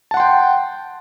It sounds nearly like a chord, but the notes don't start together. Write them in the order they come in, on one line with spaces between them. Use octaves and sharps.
A5 F#5 C6 G5